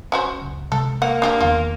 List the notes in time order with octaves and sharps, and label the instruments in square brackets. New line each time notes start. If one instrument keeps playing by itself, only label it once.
[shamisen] C#4 F#4 C5
[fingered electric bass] F#1 C#2
[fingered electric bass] C3 G#3 [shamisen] A4
[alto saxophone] A#3 [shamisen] F#5
[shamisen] D4 G4 G#4
[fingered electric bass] E2 D#3 [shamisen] F4